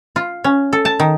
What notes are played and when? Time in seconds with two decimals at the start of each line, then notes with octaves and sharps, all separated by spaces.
0.16 F4
0.44 C#4
0.73 A4
0.85 A5
1.00 D#3